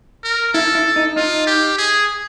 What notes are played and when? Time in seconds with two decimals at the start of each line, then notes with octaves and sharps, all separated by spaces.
0.24 A#4
0.54 E4 A4
0.75 E4
0.96 D#4
1.16 D#4 F4
1.47 G4
1.78 G#4